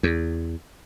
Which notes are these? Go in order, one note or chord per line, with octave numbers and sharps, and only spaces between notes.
E2